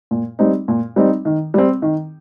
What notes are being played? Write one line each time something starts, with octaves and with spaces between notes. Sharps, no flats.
A#2
G3 C4 D#4
A#2
G3 C4 D#4
D#3
G3 C4
D#3